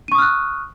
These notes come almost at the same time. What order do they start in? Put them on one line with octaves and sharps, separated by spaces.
D#7 C#6 D#6 F6 F#6